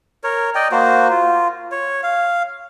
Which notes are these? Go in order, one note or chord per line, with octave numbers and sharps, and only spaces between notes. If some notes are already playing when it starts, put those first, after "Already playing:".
A#4 C#5
D5 D#5 G5
A#3 F#4 C5
F4
C#5
F5